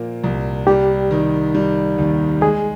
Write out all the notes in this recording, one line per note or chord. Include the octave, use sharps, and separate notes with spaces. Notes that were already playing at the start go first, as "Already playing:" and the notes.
Already playing: A#2 F3 A#3
C2
G3 G4
D#3
G3
D#2
G#3 G#4